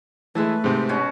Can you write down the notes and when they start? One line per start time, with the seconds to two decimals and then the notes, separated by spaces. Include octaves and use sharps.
0.35 E3 G#3 A3 B4 E5 A5
0.64 G#2 C3
0.89 B2 C#4 F#4